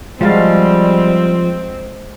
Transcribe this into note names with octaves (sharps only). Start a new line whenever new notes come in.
F3 G3 G#3 C4 F#4 F5 A5